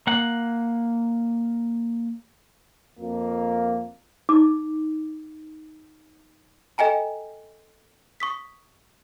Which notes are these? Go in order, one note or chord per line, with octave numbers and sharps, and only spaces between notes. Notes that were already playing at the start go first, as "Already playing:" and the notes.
A#3 F#5
F2 A#3
D#4 D6
A4 D#5 G5 G#5 A#5
C#6 D#6 B6